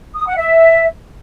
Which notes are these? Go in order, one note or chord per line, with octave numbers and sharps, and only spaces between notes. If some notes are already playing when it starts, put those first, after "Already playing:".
D#6
F#5
E5